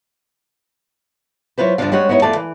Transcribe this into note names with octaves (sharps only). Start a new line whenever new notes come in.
F#3 E4 F4 B4 C5
D2 G2 C#3 F3 D4 F5
G3 G#3 C#4 F#4 C#5
B3 D#4 E4 C#5
E2 A3 F4 D5 F5 A5
E3